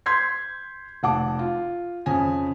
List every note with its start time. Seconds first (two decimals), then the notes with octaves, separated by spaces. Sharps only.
0.06 C6 G6 G#6 B6 C7
1.03 F1 F#5 A5 D6
1.39 F4
2.06 F2 C#3 G#5